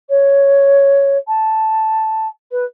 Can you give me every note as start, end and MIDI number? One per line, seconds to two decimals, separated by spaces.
0.10 1.18 73
1.28 2.28 81
2.52 2.65 71